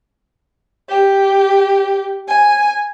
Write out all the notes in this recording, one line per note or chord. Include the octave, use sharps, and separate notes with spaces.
G4
G#5